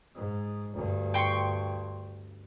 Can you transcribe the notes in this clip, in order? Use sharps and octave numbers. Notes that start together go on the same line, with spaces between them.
G#2
D2 G2
G5 C6 C#6